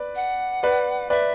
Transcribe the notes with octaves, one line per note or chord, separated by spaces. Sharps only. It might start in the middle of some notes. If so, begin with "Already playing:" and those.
Already playing: B4 D5
F#5
B4 D5
B4 D5 E5